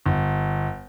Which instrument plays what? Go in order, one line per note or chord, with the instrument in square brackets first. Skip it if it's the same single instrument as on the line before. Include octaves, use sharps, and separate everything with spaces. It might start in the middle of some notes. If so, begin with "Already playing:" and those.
[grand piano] G1